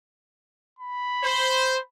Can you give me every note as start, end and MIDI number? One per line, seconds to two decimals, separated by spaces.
0.79 1.85 83
1.24 1.78 72